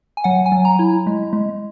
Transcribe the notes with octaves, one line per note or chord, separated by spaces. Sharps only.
G#5
F#3 F#5
G#5
F#3
A#5
E4
G#3
G#3